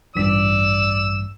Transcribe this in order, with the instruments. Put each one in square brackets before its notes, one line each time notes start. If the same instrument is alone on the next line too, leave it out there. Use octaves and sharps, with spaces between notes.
[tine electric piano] A1 G2 B6 [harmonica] D5 E6